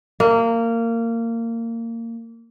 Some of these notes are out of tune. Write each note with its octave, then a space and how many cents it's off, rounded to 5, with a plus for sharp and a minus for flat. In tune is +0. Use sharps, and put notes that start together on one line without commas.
A#3 -20